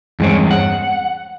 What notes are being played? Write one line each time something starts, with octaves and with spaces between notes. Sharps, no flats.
E2 G2 G#3 C4 C#4
F#5